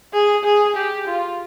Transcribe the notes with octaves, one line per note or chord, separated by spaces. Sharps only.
G#4
G#4
G4
F4